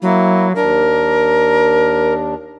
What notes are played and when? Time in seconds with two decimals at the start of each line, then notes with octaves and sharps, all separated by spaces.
0.02 F#3 A#3 E4
0.56 D#2 D4 A#4